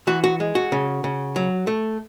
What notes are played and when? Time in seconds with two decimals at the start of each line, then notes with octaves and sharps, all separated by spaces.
0.07 E3 F#4
0.24 F#4
0.40 G#3
0.55 F#4
0.72 C#3
1.04 C#3
1.36 F#3
1.67 A3